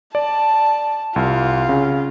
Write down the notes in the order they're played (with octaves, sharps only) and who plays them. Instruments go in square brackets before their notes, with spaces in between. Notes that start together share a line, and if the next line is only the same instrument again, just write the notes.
[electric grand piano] D5 [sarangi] A5
[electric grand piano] C2 [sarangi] F4
[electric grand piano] C#3